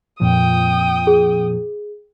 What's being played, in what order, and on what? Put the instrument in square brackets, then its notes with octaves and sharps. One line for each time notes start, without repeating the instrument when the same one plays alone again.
[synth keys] F2 A#2 F3 [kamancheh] G5 D#6
[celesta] G#4